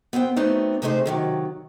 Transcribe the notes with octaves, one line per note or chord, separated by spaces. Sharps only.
B3 C4 C5 G5
F#3 A3 B3 C4 D#4 D5
C3 G#3 A3 D#4 G#4 C5
C3 D#3 F#3